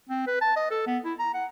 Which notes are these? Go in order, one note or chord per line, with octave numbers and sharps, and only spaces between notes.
C4
B4
A5
D#5
A4
B3
E4
A#5
F#5